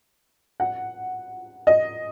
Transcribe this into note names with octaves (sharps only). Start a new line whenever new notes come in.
F#5
D#5